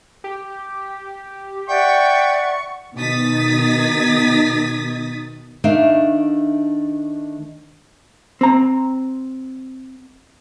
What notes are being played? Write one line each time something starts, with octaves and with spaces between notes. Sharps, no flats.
G4
D5 E5 F#5 G5 C#6
B2 D#3 D#4 D#6 A6 B6
D#3 A3 D4 E5 F5
C4 A#5